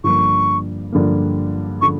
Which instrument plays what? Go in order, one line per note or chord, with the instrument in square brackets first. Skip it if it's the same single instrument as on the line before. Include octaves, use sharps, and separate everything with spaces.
[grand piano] G2 D3 F3 A#3 [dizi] C#6
[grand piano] G2 D3 F3 A#3
[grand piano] D3 F3 [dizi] C#6